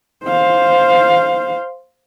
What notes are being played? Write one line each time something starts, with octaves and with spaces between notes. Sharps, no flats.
C5 F5